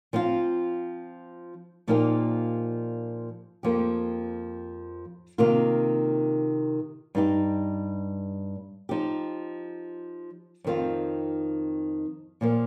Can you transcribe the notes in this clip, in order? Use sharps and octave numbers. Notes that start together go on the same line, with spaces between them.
F3 C4 F4
A#2 F3 A#3 D#4 G4
F2 F3 A#3 G4
C3 D#3 A#3 F4
G2 G3 D#4 G4
F3 D#4 G4
F2 D#3 C4 F4
A#2 F3 A#3